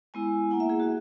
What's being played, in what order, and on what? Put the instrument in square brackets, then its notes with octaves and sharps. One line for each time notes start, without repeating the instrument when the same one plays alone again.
[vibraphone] G#3 B3 E4 G#5
A#3 E4 F#5
E5
G#4
F#4